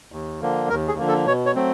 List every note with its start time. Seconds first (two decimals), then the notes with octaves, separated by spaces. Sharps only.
0.12 D#2
0.41 D3 F3 A#3
0.69 D#2 A#4
0.88 G#4
0.98 D3 F3 A#3
1.08 A4
1.26 B2 C#5
1.46 C#5
1.55 F#3 A3 C4